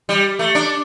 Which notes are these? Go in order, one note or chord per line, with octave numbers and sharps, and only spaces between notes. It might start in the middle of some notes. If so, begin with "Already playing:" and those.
G3
A3
D4